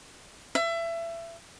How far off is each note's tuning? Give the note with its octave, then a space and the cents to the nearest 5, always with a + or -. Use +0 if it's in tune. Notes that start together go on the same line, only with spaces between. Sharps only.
E5 +25